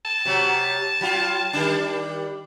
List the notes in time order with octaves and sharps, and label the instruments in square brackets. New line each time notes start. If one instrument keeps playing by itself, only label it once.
[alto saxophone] A5
[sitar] C3 F#3
F#3 F4
D#3 G3 D4